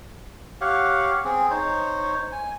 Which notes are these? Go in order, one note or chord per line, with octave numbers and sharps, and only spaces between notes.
G4 C#5 F5 F#5
C4 G#4
D#4 C5 C#5
G#5